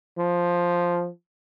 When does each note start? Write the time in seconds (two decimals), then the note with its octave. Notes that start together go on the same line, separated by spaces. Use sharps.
0.18 F3